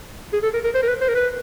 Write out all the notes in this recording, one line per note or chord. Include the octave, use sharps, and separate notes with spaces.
G#4
A4
A#4
A#4
C5
A#4
B4
C5
A#4
B4